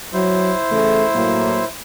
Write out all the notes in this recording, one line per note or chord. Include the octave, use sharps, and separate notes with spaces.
F#3 E4 C5
C#3 E3 A3
A2 F#3 A#3